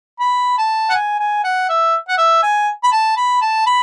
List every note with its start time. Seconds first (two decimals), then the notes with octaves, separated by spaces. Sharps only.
0.20 B5
0.58 A5
0.89 F#5
0.94 G#5
1.19 G#5
1.44 F#5
1.69 E5
2.09 F#5
2.18 E5
2.43 G#5
2.84 B5
2.92 A5
3.17 B5
3.42 A5
3.66 B5